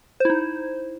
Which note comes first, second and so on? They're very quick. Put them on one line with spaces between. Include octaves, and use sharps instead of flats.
C5 E4 D#4